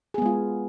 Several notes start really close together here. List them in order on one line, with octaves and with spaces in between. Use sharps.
G#4 B3 G#3 F4